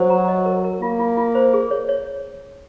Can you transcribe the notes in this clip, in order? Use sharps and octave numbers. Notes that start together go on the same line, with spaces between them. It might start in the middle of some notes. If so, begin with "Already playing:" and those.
Already playing: F#3 C5
A#5
D#5
A#4
A#4
A#3 F4
F4
F4
C5
G#4
C#5
C#5